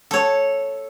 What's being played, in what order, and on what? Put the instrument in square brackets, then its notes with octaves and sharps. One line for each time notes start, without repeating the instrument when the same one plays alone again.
[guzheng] A4 C#5